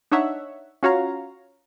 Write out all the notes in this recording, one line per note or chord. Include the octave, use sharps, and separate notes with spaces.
D4 D#4 C#5 E5 F#5
C#4 F4 F#4 C#5 F5 A#5